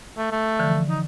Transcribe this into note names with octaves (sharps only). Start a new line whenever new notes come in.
A3
A3
D3 E3 F3
D#4